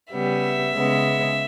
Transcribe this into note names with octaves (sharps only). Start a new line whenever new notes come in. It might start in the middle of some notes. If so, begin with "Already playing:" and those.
C#3 G3 B3 E5
C#3 G#3 B3